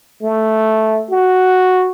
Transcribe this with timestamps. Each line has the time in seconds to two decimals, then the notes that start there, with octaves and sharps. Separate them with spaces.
0.22 A3
1.10 F#4